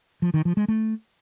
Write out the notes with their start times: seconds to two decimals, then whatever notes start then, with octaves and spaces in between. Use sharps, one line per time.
0.22 F3
0.34 D#3
0.45 F3
0.57 G#3
0.68 A3